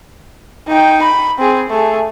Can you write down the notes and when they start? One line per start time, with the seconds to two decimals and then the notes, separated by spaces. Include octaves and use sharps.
0.68 D#4 G5
1.02 B5
1.39 C4 G#4
1.70 A3 G#4